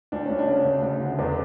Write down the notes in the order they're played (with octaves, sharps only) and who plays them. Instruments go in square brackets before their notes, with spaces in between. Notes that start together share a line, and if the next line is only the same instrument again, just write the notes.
[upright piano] D2 D4
D2 C#4
D4
C#3
D2
D2
D3
E2 D4